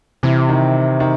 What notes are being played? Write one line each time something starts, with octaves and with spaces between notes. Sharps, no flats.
C3 E3
D#3
D#3